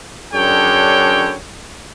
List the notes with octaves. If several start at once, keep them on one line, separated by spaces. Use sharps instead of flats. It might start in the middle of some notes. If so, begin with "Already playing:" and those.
F#2 D3 D4 G#4 C#5 G5